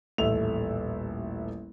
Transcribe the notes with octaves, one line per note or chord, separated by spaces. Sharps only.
D#1 A1 A3 E5 F7